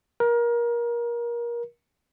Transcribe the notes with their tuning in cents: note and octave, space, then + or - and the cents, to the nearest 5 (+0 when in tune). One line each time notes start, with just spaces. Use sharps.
A#4 +25